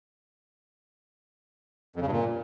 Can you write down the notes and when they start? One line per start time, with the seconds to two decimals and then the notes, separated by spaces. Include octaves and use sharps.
1.96 F2
2.01 C#3
2.07 G2
2.12 A#2